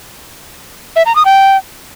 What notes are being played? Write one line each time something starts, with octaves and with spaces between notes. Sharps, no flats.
E5
A#5
D#6
G5